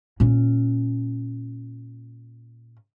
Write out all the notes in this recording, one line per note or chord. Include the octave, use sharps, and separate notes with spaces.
A#2 C#4